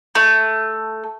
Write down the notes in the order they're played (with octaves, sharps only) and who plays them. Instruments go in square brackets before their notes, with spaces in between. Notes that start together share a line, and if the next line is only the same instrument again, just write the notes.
[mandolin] A3